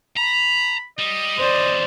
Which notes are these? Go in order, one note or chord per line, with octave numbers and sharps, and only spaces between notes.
A#5 B5
G3 D#5
E2 D3 C5 D5